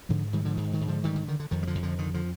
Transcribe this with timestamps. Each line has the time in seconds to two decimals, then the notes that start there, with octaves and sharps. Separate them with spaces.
0.09 G#2 D3 F3
0.33 G#2 D#3 G3
0.45 D3 F3
0.57 G#2 D#3
0.73 D#3
0.81 G#2
0.88 D3 F3
1.04 D3 D#3 G3
1.16 D#3
1.28 D3 D#3
1.40 D3
1.51 F2 D#3
1.63 G3
1.67 D3 F3
1.75 F2
1.83 D3 F3
1.98 D3 D#3
2.14 D3 F3